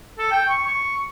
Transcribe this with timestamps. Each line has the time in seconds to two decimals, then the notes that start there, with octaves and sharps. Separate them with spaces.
0.18 A4
0.31 G5
0.48 C#6
0.66 C#6